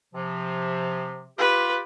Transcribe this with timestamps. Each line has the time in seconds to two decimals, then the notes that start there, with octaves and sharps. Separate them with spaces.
0.14 C3 F3
1.38 F4 G4 B4